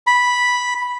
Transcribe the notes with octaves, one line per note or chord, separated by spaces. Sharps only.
B5